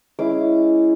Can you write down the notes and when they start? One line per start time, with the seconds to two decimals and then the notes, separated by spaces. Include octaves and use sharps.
0.19 G#3 C#4 E4 D6